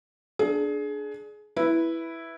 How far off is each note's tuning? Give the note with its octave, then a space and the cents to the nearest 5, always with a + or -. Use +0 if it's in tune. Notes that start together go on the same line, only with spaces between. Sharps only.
D4 +0 G#4 +25
E4 +0 B4 -5